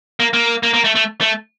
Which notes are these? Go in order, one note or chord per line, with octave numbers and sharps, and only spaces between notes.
A#3
A#3
A#3
A#3
A3
A3
A3